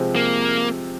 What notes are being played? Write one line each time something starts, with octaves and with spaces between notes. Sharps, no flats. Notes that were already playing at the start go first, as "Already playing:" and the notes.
Already playing: C3 F3 G#3 C4
A#3